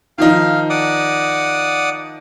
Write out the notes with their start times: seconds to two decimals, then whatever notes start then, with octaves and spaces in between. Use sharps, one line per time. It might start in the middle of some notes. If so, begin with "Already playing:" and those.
0.18 D#3 F3 D#4 F5
0.70 D5 F#5 D#6